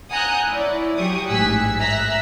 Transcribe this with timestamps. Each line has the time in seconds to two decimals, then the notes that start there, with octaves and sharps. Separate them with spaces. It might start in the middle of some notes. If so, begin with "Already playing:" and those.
0.10 F#5 G#5 A#5 D#6 F#6 G6
0.49 E4 C#5 D5
0.98 F#3 G4 C#6 D#6
1.29 A1 G#2 G#4 E6 F#6 B6
1.79 E5 A#5 E6 F#6 B6